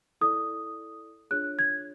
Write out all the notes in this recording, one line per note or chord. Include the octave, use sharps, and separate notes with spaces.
E4 A4 D5 D#6
D4 F4 G#4 C#5 F#6
G#6